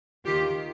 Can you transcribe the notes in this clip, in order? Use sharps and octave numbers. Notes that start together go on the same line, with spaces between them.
D#2 D#3 F4 G4